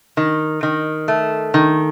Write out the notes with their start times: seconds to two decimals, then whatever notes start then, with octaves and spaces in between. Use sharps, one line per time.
0.17 D#3
0.63 D#3
1.08 A3
1.54 D#3